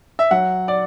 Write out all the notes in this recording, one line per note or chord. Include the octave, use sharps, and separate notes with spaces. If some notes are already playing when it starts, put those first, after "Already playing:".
E5
F#3 F#5
D5